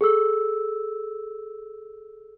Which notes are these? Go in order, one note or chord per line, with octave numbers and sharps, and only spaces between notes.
G#4 A4 E6